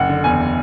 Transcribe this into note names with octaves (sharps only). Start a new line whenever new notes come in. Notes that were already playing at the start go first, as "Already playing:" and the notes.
Already playing: F#1 F#5
D3
E2 G#5